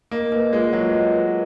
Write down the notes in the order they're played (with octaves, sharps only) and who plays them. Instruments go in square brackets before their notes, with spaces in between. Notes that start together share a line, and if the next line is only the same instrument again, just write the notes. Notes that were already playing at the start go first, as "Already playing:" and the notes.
[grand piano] A#3 [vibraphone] D#5
[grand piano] A#3 [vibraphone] B4
[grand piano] G#3 [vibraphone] F4
[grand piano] F#3 [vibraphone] F#5
[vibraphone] D#5
B4